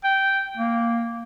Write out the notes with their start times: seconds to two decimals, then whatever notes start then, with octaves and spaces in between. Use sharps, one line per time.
0.04 G5
0.57 A#3